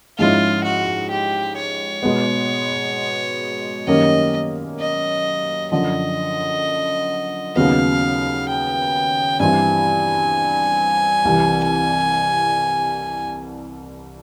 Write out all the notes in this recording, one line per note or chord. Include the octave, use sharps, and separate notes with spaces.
G#2 F3 G#3 C#4 E4 F4
F#4
G4
C#5
B2 G#3 B3
F#2 D#3 G3 A#3 C#4 D#5
D#5
F#2 D3 F3 D#5
D#2 C#3 F#3 B3 F5
G5
G2 E3 G3 C4 E4 G#5
C2 C3 E3